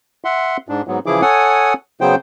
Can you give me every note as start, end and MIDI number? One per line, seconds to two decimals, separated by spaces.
0.25 0.57 76
0.25 0.57 78
0.25 0.57 84
0.69 0.82 44
0.69 0.82 62
0.88 0.99 44
0.88 0.99 54
0.88 0.99 59
1.06 1.22 49
1.06 1.22 52
1.06 1.22 53
1.06 1.22 64
1.06 1.22 68
1.06 1.22 86
1.22 1.74 69
1.22 1.74 73
1.22 1.74 78
1.22 1.74 80
1.22 1.74 87
2.01 2.15 49
2.01 2.15 54
2.01 2.15 59
2.01 2.15 72
2.01 2.15 79